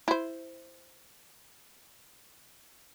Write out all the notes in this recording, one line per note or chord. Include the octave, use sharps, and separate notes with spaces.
E4 C5